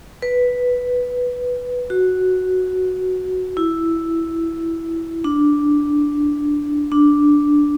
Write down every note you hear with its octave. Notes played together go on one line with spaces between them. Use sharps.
B4
F#4
E4
D4
D4